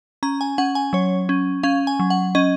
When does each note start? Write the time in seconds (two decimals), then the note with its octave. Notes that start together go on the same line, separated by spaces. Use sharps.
0.23 C#4 A#5
0.41 G#5
0.58 C#4 F#5
0.75 G#5
0.93 F#3 C#5
1.29 C#4
1.63 C#4 F5
1.87 G#5
2.00 F#3
2.10 F#5
2.35 C#4 D#5